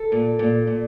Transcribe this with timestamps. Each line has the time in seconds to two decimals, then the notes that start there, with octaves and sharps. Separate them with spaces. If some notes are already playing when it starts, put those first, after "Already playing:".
Already playing: A4
0.12 A#2
0.39 A#2
0.67 A#2